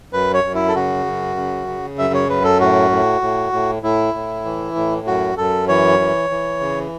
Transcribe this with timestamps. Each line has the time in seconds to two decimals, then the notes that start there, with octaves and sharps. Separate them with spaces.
0.13 F#2 B4
0.34 C#5
0.44 F#2
0.55 E4
0.68 A4
0.75 C#3 F#4
1.06 F#2
1.36 C#3
1.67 C#3
1.98 F#2 E5
2.14 C#5
2.29 F#2 B4
2.44 A4
2.60 A2 F#4
2.91 A2
3.21 A2
3.52 A2
3.83 A2 E4
4.14 A2
4.45 E3
4.76 A2
5.07 F#2 F#4
5.37 F#2 A4
5.68 E3 C#5
5.99 E3
6.30 E3
6.60 C#3